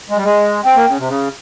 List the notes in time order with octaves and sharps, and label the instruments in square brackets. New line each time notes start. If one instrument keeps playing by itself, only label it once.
[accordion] G#3
G3
G#3
[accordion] C4 [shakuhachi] G5
[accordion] A#3
C#3
C3
C#3